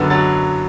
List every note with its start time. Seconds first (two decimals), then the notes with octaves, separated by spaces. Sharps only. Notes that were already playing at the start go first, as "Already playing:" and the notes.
Already playing: F#2 D3 F#3 B3
0.10 F#3 A6